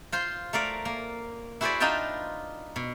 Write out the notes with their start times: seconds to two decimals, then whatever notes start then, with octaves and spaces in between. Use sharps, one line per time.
0.12 F4 C5 C6
0.53 A3 A#4 D5 F5
0.85 A#3
1.61 E4 F#4 G#4 B4 C5 D5
1.80 D4 D#4 F4 D#5 G5 A5
2.76 B2